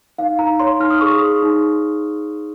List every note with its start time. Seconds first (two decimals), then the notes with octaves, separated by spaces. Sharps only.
0.18 D#4 F5
0.39 D#4 A#5
0.60 C#5 C6
0.80 D#4 F6
0.90 D#6
1.01 G#4 C#6
1.11 D#6
1.22 G#4
1.43 D#4